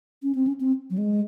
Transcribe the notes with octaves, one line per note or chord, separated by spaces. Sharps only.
C#4
C4
C#4
C4
F#3
G#3